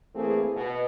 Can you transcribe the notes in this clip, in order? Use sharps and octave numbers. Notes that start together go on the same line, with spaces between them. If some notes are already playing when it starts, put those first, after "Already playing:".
E3 A3 A#3 C4 G#4
B2